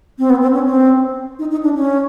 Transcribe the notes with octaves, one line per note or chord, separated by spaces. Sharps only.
C4
B3
C4
C#4
C4
D#4
D#4
D4
C#4